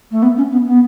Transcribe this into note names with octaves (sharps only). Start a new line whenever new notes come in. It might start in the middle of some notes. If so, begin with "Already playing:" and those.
A3
B3
C#4
B3
B3